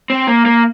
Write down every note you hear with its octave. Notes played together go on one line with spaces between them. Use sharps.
C4
A#3
A#3